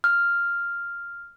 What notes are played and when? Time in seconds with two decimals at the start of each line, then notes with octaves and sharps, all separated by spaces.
0.04 F6